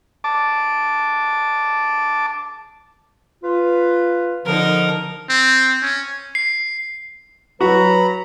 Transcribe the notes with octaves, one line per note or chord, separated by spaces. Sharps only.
A5 D6
F4 B4
D3 F3 D#4 A#4
C4
C#4
C7
F#3 F#4 B4 A#5 B5